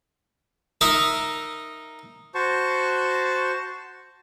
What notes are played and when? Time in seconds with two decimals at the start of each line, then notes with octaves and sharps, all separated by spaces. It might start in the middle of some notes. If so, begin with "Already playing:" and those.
0.81 D#4 A#4 E5
2.35 F#4 C5 A5 C#6